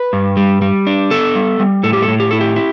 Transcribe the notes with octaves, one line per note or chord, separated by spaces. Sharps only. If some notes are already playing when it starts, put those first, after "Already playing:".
Already playing: B4
G2
G3
G3
D4
B3 A4
G3
G3
A2 A4
G4
A4
A2
G4
E4 A4
G4
E4